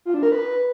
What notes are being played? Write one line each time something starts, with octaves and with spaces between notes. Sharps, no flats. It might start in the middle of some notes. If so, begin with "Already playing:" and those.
F4
D4
A#4
B4